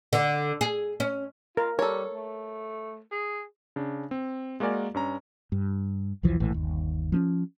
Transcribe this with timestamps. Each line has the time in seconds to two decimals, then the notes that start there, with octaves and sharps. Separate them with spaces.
0.13 D3
0.61 G#4
1.00 C#4
1.57 F4 A#4
1.79 G3 A4 A#4 C#5
2.14 A3
3.11 G#4
3.76 C#3 D4
4.11 C4
4.60 G#3 A#3 F#4 A#4 D5 G#5
4.94 G2 C#4 A#5
5.52 G2
6.23 B1 E2 E3 F3
6.40 A#1 A2 E3
6.54 G1 D#2
7.12 F3 C4 C#4